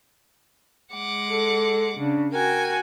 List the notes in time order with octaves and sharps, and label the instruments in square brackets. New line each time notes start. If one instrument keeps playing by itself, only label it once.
[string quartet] G#3 F#5 D6
[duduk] A4
[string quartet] C#3 [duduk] D4
[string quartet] F#4 G5 G#5 [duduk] A#4